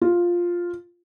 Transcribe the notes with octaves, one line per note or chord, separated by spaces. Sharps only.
F4